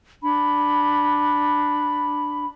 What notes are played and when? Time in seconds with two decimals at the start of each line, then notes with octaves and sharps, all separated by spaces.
0.22 D4 B5